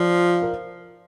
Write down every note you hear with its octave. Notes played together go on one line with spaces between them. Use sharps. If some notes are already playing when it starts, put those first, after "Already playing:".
Already playing: F3 C5 D5 F5
A#4